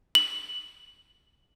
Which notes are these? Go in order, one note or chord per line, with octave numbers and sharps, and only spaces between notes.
F#7